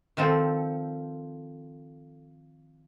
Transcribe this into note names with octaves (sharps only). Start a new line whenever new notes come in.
D#3 F3 C4 A4